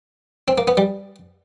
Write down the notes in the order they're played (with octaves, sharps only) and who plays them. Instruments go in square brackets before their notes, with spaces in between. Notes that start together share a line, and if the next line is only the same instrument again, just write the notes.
[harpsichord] C4
A#3
B3
G3